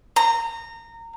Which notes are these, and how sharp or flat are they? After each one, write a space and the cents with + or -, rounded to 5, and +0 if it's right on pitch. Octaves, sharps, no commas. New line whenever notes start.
A#5 -20